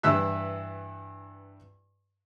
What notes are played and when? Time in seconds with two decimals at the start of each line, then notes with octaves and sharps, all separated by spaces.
0.03 G2 E3 E4 E5 E6 F#6